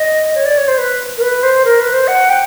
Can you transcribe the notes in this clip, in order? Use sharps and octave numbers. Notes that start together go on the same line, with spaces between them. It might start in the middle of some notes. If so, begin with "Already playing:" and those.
Already playing: D#5
C#5
D5
C#5
C5
B4
A#4
B4
C5
A#4
B4
C5
F#5
G5